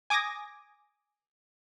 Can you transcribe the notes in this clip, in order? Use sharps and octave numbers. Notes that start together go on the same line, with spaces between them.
G#5 D6 D#6 G#6 A#6